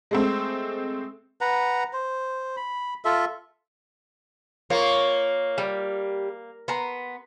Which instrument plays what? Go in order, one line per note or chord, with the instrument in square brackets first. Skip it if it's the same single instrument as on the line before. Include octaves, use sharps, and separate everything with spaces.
[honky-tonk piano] G#3 A3 C4
[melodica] B4 F#5 A#5
C5
B5
F4 A4 E5
[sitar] A#3 [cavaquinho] F4 C#6 [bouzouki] C#5
[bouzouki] G3
[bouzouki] B3 [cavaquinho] A#5 C6